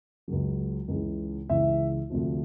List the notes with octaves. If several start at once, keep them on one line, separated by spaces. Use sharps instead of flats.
C#2 C#3 F#3
C#2 C#3 E3
C#2 C#3 E3 E5
D2 C3 F3